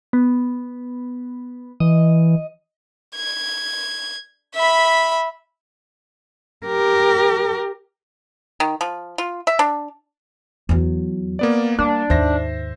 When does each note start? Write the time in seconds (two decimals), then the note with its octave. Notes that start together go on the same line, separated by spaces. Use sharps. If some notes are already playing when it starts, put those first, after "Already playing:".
0.13 B3
1.80 E3 D#5
3.16 G#6
4.55 E5 B5
6.66 G4 A#4
8.60 D#3
8.81 F3
9.18 F4
9.47 E5
9.59 D4
10.69 E2 F#3
11.39 A#3 B3 D5
11.78 G3 A#3 D4
12.10 D#2 G#2 C5 E5 A#6